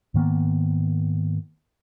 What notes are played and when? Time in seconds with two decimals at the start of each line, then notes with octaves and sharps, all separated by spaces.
0.14 G#2 D#3 A#3 B3